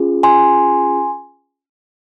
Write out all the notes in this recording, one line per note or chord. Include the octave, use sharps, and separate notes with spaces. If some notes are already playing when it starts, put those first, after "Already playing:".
Already playing: C#4 F4 G#4
G#5 C6